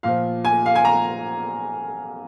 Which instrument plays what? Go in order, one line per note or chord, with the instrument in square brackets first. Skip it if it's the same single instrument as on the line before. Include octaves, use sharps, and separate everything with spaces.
[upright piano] A#2 F3 F5
G#5
F5
G#5
A#5